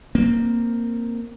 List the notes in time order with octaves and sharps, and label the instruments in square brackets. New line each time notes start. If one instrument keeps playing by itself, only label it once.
[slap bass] A#3 C4